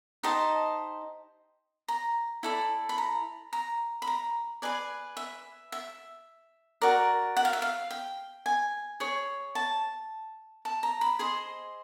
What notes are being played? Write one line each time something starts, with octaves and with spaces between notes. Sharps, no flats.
D#4 G4 C5 D#5 A5
A#5
E4 A4 D5
B5
A#5
A#5
B5
A#5
G#4 B4 D5 G#5
E5
E5
F#4 A#4 D5
F#5
F5
E5
F5
G5
G#5
G#4 C#5
A5
A5
A#5
B5
G#4 C5 D#5 C6